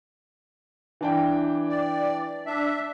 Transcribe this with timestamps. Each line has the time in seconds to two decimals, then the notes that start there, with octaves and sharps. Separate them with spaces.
1.01 E3 D4 G5
1.69 D5
2.46 D4 E5